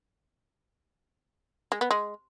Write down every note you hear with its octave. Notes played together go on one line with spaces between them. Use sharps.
G#3
B3
G#3